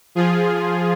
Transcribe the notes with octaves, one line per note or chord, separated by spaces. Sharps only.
F3 F4 G#4